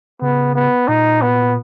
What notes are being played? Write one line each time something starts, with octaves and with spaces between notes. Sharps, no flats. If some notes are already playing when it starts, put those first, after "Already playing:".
C#3 B3
B3
A#2 D#4
B3